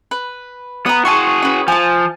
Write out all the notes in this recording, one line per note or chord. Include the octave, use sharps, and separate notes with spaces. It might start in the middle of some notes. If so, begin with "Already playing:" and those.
B4
B3 A#5 D#6
F#4 G#4 A5 C6 C#6
C#4 B4
F3 G#5 A5